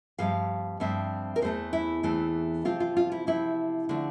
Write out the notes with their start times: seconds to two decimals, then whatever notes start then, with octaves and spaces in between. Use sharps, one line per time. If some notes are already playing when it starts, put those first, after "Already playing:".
0.18 G2 F3 A3 C4 F5
0.80 G2 F3 A3 C4 E5
1.36 A#4
1.42 E2 E3 A3 C4 C5
1.73 E4
2.03 E2 E3 A3 C4
2.65 C3 F3 C4 F4
2.80 F4
2.97 F4
3.12 E4
3.27 C3 F3 C4 E4
3.89 D3 F3 A3 C4